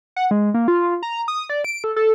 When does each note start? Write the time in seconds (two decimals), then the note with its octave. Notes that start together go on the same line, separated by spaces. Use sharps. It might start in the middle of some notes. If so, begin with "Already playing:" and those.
0.16 F#5
0.31 G#3
0.54 A#3
0.68 F4
1.03 A#5
1.28 D#6
1.50 D5
1.64 D7
1.84 A4
1.96 A4